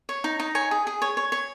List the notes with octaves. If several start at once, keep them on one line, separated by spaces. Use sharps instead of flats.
C#5
D#4
D#4
C#5 G#5
G#4
G#4
C#5
C#5
C#5